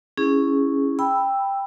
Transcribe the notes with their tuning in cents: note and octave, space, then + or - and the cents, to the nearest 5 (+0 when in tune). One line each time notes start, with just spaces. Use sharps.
C#4 +0 E4 +0 G#4 -10
G5 +10 B5 +0 E6 +0